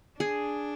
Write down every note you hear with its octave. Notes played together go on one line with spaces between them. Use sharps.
D4 G#4